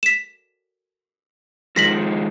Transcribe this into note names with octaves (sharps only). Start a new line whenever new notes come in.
B6 E7
D#3 F3 G#3 A#6 B6 F#7